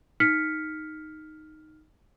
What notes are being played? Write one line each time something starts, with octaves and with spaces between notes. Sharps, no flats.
D#4 F6 B6 C#7